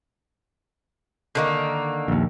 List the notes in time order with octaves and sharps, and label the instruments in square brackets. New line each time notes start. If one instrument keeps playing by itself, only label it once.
[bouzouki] D3 D#3 A#3
[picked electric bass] A#1 D#2